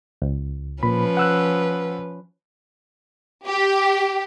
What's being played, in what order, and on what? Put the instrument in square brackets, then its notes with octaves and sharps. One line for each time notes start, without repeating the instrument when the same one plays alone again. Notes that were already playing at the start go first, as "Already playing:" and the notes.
[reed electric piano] C#2
[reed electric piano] A#2 B5 [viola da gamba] F3 C#4 B4
[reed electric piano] F#5 E6 F#6
[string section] G4